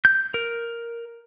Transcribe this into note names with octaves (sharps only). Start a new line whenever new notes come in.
G6
A#4